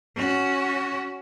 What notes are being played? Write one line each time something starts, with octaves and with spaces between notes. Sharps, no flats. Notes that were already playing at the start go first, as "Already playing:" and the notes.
C#4 F#4